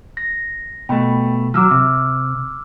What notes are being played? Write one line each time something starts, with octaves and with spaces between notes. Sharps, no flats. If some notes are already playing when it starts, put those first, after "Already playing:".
A#6
B2 A3 G5 B5
F3 F#3 D6 E6 F6
C3